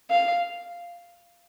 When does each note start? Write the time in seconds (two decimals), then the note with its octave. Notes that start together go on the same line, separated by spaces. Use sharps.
0.10 F5